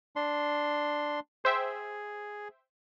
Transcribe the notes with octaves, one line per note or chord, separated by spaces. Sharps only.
D4 C6
G#4 C5 E5 G5